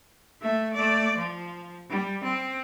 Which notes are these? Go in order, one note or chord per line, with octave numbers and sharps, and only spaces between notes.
A3 E5
A3 D5
F3
G3
C4